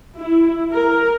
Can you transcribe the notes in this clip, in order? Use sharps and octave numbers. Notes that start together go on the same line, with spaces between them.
E4
A#4